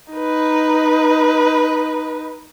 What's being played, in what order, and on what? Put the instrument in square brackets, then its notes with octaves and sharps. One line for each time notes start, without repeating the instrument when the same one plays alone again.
[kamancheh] D#4 B4